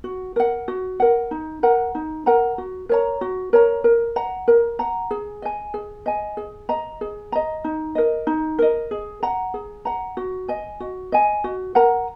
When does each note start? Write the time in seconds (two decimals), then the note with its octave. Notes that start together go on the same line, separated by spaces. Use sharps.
0.04 F#4
0.36 A#4 F#5
0.68 F#4
1.00 A#4 F#5
1.31 D#4
1.63 A#4 F#5 A#5
1.95 D#4
2.26 A#4 F#5 A#5
2.58 F#4
2.89 A#4 C#5 A#5
3.21 F#4
3.53 A#4 C#5 A#5
3.84 A#4
4.16 F#5 A#5
4.48 A#4
4.79 F#5 A#5
5.11 G#4
5.42 D#5 G#5
5.74 G#4
6.06 D#5 G#5
6.37 G#4
6.69 D#5 A#5
7.01 G#4
7.32 D#5 A#5
7.64 D#4
7.95 A#4 D#5
8.27 D#4
8.59 A#4 D#5
8.91 G#4
9.23 F#5 A#5
9.54 G#4
9.85 F#5 A#5
10.17 F#4
10.48 D#5 G#5
10.80 F#4
11.12 D#5 G#5
11.44 F#4
11.75 A#4 F#5 A#5